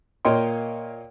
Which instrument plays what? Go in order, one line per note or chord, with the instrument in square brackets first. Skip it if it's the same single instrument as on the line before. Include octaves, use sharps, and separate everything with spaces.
[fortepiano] A#2 A#3 C#5 D#5 G5 C6